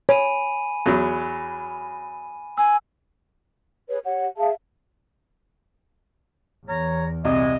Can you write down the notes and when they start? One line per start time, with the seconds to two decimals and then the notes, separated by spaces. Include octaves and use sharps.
0.09 C#5 G#5 B5 D#7
0.86 E2 F#3
2.58 G#5 E6
3.88 G#4 B4 C#5
4.04 G4 C#5 F#5
4.37 G#4 E5 F5 A5
6.68 E2 C#5 A#5
7.25 C2 A#2 G#3 D#5